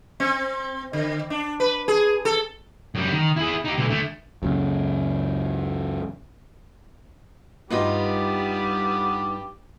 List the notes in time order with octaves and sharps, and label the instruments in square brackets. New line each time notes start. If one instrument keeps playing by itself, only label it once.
[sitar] C4
D3
D4
B4
G#4
A4
[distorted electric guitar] F#2 G3
D#3
E4 G#4
D#4 G4
B1 D3
D3 A3
[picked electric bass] C#2 F#2
[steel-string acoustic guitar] G2 D#4 F4 [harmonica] G3 B3 G4